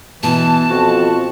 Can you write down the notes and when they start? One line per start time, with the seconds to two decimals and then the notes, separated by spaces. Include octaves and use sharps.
0.23 B2 E3 A5
0.70 F2 F#4